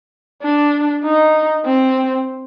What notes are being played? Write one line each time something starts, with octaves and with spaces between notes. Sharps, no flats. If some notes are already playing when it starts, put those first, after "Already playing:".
D4
D#4
C4